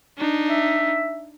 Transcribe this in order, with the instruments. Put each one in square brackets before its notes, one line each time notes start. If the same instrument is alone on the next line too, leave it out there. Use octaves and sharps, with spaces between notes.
[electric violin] D4 D#4
[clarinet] E5